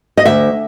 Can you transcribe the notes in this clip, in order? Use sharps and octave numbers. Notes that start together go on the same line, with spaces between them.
D#5
D2 E5